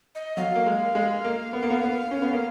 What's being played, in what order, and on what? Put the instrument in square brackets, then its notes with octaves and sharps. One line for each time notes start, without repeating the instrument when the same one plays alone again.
[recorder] D#5
[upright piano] F#3 [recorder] F5
[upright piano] A#3
G#3
G#3
A#3
B3
A#3
B3
B3
C#4
B3
A#3